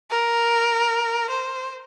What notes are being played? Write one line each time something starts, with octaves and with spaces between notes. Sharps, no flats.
A#4
C5